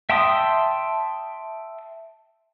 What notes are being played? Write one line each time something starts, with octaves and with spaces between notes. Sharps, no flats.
E5 G5 A5 C6 D#6